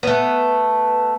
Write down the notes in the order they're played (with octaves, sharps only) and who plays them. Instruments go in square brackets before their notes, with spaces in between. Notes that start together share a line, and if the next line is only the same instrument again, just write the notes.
[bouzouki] A3 B3